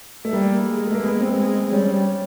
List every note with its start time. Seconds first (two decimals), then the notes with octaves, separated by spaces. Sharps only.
0.25 A3
0.32 G3 A#3
0.68 G#3
0.87 A3
0.95 A#3
1.03 G#3 B3
1.20 C4
1.37 G#3
1.72 G3 C#4